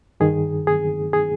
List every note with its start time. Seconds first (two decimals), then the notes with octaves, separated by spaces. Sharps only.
0.20 G2 D#3 G#4
0.67 G#4
1.13 G#4